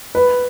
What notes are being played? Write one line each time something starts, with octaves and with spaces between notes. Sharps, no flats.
B4